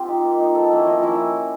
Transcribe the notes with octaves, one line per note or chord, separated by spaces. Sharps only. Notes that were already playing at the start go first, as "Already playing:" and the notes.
Already playing: C4 F4 G4
D#4
A#3
D#4
F3 A4
A#3 C#4 E4 A4
F3 D#5
A#3 C#4 E4